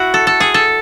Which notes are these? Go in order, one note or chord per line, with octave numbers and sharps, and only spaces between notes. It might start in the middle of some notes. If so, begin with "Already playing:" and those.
Already playing: E4 F#4
A4
A4
G#4
A4